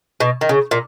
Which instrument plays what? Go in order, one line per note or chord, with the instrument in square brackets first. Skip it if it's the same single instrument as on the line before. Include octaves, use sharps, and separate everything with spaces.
[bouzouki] B2
D#3
C#3
A#2